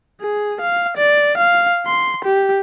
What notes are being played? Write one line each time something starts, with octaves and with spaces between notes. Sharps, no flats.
G#4
F5
D5
F5
C6
G4